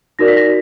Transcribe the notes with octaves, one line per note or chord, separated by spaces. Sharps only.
D#4 F#4 A#4 D5 A#6
B6
A#6